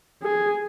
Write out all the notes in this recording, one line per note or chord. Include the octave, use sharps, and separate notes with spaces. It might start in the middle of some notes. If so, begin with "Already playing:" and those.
G#4